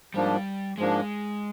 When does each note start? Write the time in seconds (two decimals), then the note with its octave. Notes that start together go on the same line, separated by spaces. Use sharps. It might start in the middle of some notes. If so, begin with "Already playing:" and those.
0.14 G#2 F3 G3 A#3 D4
0.78 G#2 F3 G#3 A#3 D4